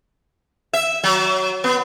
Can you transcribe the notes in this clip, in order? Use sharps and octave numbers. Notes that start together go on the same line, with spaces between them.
E5
F#3
B3